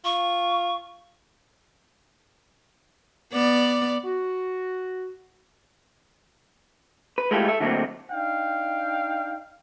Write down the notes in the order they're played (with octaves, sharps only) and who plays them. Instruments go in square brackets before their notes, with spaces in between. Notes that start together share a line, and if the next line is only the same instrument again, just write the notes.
[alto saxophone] F4 [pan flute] C#6
[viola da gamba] B3 D5
[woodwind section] F#4
[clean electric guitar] B4
G#3 A3 E4 F4 G4 A4
A4 E5
D3 F#3 A3 A#3 C4
[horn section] D4 D#4 F5 G5